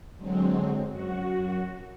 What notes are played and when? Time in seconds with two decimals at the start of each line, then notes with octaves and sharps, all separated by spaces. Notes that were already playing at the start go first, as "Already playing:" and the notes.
0.17 D3 F#3 G#3 C4
0.88 F#2 F#4